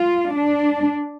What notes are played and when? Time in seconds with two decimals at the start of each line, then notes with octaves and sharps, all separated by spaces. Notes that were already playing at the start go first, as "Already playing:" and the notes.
Already playing: F4
0.32 D4